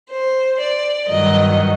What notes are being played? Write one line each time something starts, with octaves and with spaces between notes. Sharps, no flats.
C5
D5
G2 D#3 F#3 D#5